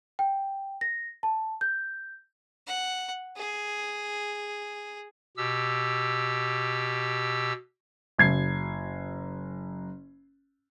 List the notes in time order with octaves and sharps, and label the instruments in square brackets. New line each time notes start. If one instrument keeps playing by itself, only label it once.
[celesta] G5
A#6
A5
G6
[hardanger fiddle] F#5
G#4
[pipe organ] B2 G4 E6
[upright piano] F#1 G#6 C7